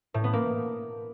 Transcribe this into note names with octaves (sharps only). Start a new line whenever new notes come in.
A2
B3
A#3